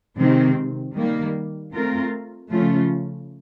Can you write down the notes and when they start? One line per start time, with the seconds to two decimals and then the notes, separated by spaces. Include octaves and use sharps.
0.18 C3 D#3 G#3 C4
0.95 D#3 G3 A#3
1.73 A3 C4 F4 A#4
2.50 C#3 F3 A3 C#4 F4